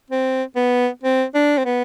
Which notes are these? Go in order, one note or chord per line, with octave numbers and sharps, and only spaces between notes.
C4
B3
C4
D4
C4
B3